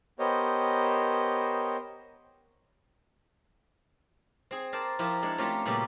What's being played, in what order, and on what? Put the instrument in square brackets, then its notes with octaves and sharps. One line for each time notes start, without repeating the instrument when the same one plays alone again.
[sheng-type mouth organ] B3 G4 A#4 C5 C#5 D#5
[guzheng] C4 G#4
A#4 C5 D5 A5
F3 E4 F4 G4 A#4
G#3 D4 A4
A3 C4 C#4 F4 G4 A#4
A#2 C#3 G3 B3 F#4 G4